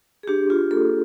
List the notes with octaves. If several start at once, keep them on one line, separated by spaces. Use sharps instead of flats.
G#4
D4 G4
F4 G4
A#3 A4